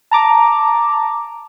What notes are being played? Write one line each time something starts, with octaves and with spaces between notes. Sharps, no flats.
A5 A#5 D6